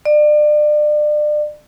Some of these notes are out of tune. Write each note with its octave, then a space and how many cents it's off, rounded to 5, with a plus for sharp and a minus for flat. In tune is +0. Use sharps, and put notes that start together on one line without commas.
D5 +30